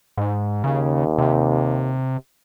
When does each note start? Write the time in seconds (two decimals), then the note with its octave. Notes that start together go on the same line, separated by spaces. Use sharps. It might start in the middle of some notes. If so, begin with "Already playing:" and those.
0.17 G#2
0.64 D#2 C#3
1.18 C3